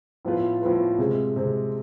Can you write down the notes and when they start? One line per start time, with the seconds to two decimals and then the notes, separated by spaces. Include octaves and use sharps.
0.25 A2 F3 B3 F4 B4
0.61 A2 F3 B3 F4 B4
0.98 C3 G#3 C4
1.36 C3 G#3 C4